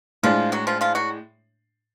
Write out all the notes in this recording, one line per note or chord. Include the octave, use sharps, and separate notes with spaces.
A2 F3 G#3 D4 F4
F#3 F#4
F3 F4
F3 F4
F#3 F#4